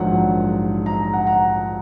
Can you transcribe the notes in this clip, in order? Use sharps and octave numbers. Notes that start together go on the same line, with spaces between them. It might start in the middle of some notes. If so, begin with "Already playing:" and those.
Already playing: A#1 G#2 D#3 F#3 F#5
A#5
F#5
A#5